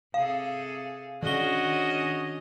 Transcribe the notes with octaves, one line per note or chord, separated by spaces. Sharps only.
C3 G#4 A4 F5
D#3 C#4 D4 F#4 D#5 G7